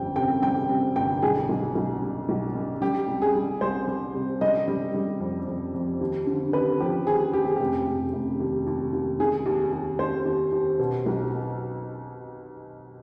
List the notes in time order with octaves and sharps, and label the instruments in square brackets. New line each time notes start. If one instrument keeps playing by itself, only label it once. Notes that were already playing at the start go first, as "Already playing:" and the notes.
Already playing: [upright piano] G1 F2 G5
C3 G5
G3 G5
C3
G1 G5
B1 G#4
B1
B1
G3
B1
G3
G3 G4
C2
G#4
G3
C2 C5
G3
C3
G3 D#5
G3
G3
F2
F2
F2
D#2
D3
D#2 B4
F3 G4
D#2 G#4
D#2 G4
G#4
F1 G4
F1
F1
D#2
D#2
D#2
D#3 G#4
D#2
D#2
D#2 C5
D#2
D#2
B2
B1